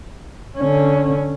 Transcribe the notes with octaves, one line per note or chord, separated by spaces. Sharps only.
D3 C#4